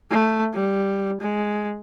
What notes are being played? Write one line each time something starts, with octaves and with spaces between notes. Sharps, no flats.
A3
G3
G#3